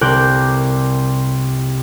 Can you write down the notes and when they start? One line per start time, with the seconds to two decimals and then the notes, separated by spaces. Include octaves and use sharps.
0.01 C2 A#4 D5 F#6 G6